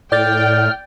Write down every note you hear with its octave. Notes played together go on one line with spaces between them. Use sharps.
A2 D5 G5 F6 G6 A6